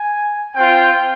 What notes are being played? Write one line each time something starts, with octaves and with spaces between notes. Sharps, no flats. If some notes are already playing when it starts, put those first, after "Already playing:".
Already playing: G#5
C4 F4 G5